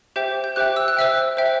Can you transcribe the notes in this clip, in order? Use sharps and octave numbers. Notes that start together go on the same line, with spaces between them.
G4 C5 E5 G5 G6
G6
G4 C5 E5 G5 F#6
E6
F#6
C5 E5 G5 E6
C5 E5 G5